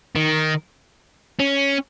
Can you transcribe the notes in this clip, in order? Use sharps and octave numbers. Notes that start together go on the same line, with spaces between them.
D#3
C#4